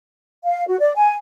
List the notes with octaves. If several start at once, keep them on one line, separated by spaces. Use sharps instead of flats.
F5
F#4
D5
G#5